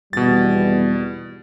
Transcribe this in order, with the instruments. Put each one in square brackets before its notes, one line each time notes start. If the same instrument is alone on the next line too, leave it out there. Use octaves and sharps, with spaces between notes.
[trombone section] G#1 E2 G3 [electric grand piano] B2 A6